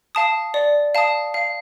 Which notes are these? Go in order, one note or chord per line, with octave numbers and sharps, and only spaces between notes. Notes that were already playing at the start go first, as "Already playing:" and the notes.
F5 A5 D#6
D5
F5 A5 D#6
F5